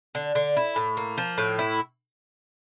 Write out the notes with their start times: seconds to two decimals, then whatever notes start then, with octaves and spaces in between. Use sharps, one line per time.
0.15 D3
0.35 D3
0.57 E4
0.76 A2
0.97 A#3
1.18 F3
1.38 A2
1.59 E4